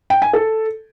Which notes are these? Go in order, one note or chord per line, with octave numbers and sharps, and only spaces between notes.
G5
G#5
A4